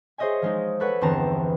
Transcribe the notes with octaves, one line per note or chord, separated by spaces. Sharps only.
G#4 C5 C#5 D#5 E5 G#5
F3 G#3 D#4
A4 B4 C#5 F#5
G1 E2 E3 C4 A5 A#5